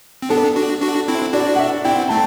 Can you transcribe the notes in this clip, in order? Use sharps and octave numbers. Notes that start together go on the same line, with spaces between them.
C4
B3 D4 A4
D4 F#4
D4 F#4
C4 E4
D4 F#4 D5
F#5
E5
C4 E4 G5
A3 C4 A5